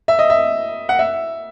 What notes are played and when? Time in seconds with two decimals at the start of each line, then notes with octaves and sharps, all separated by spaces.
0.08 E5
0.19 D#5
0.30 E5
0.89 F#5
0.99 E5